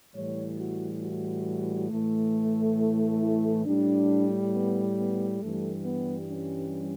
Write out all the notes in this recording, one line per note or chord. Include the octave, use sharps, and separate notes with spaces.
A2 E3 G3 C#5
F#4
F#4
A2 E3 A3
E4
A2 G3 D4
B3
B3
G2 E3 G3 A3
B3
C#4